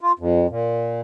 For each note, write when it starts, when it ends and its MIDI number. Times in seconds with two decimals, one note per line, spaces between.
0.01 0.12 65
0.19 0.47 41
0.50 1.01 46